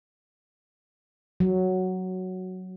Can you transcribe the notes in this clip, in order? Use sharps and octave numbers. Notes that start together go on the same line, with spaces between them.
F#3